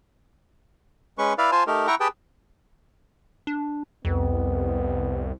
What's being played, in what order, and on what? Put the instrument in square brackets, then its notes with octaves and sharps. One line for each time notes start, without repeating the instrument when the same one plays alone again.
[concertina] G#3 C#4 B4 C#6
E4 B4 D5 F5
F4 C5 G#5 A5
A3 D#4 G4 A#4
E4 F#5 G5 A#5 C#6
G4 G#4 B4 G5 A5
[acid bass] D4
[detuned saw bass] C2 [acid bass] F2 [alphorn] B3